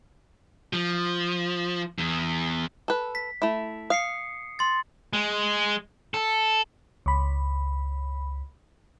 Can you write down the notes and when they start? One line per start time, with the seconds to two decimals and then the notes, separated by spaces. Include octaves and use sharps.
0.73 F3
1.98 E2
2.88 A4 B4
3.15 B6
3.42 A3 E4
3.90 F5 D#6 C7 C#7
4.59 C6 A6
5.13 G#3
6.14 A4
7.06 C#2 B5